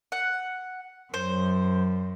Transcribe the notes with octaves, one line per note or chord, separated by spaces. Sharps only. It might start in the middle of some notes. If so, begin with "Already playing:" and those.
F#5
F#2 C5